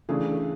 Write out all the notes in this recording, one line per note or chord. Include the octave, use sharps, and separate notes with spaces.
C#3 E3 A3 D4 G#4